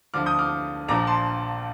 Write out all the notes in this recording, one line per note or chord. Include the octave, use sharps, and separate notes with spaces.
D2 D3 F3 D6 F6
D#6 G6
D6 F6
A#1 A#2 F3 A#5 D6
A5 C6